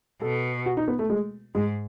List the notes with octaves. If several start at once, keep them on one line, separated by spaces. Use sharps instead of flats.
B2 A4
F#4
D#4
B3
A3
G#3
G#2 G#3